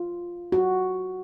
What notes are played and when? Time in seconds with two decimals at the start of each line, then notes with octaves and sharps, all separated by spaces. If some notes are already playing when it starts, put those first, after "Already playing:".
Already playing: F4
0.52 F#4